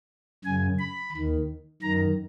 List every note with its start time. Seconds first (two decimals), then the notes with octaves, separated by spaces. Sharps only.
0.45 F#2 C#3 G#5
0.79 B5
1.13 D#2 D#3
1.82 F#2 D#3 A#5